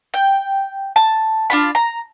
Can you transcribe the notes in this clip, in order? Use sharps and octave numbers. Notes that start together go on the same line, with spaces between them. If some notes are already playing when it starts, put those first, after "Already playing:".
G5
A5
D4 F4 B5
A#5